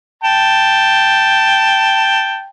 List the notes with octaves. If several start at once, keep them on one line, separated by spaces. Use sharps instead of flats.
G5 A5